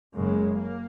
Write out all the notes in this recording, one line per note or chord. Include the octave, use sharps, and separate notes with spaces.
F#1 F#2 C#3 G#3
A#3